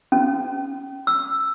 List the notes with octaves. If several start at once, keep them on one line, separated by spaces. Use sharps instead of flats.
C#4
E6